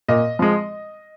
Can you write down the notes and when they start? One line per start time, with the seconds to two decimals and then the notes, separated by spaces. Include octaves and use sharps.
0.08 A#2 D#5
0.39 F3 G#3